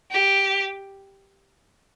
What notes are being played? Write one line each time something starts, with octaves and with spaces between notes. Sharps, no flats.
G4